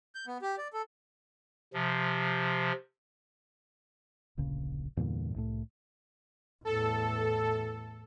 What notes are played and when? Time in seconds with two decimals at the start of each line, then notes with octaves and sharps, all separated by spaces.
0.15 G6
0.27 B3
0.42 G4
0.58 D5
0.73 A4
1.74 C3 F3
4.37 D1 A#1 C#3
4.97 E2 G2 A#2 D3
5.36 C2 A2 A3
6.65 E2 A2 A4